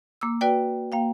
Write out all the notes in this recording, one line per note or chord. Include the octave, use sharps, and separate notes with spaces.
A#3 D6 E6
F#4 B4 D5 G5
A#3 F5 G5